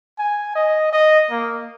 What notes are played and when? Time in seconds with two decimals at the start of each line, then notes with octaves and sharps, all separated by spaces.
0.19 G#5
0.56 D#5
0.93 D#5
1.31 A#3